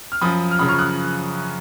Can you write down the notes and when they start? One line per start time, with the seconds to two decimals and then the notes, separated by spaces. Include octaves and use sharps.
0.12 F6
0.21 F#2 F3 B5 D#6
0.51 F6
0.59 F#2 C#3 F3 B5 D#6
0.68 C#6 F6
0.78 D#6 F#6